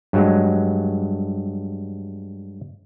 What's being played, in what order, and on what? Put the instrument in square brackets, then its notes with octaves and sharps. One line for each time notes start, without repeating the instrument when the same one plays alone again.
[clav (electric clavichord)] G2 F#3 G#3